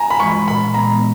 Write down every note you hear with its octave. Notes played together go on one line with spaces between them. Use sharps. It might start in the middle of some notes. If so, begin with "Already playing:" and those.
Already playing: G#5 A#5
B5
E3 G#3 C#6
B5
A#2 B5
G#3 B3 A#5